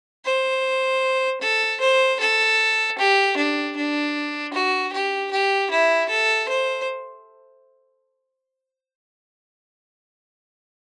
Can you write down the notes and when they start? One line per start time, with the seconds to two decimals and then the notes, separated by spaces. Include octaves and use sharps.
0.25 C5
1.41 A4
1.81 C5
2.20 A4
2.98 G4
3.37 D4
3.76 D4
4.54 F#4
4.93 G4
5.31 G4
5.71 E4
6.09 A4
6.49 C5